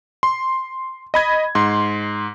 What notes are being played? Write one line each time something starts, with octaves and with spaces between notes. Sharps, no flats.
C6
D#5 B5 G#6
G#2 C6